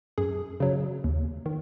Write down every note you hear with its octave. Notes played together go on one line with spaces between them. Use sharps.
F#2 G#4
C#3 F#3
D#2
D#3